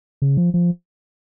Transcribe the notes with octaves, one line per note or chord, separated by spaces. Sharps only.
C#3
F3
F3